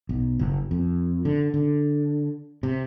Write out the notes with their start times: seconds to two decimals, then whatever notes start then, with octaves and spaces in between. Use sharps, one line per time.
0.09 B1
0.39 F#1
0.71 F2
1.25 D3
1.54 D3
2.63 C3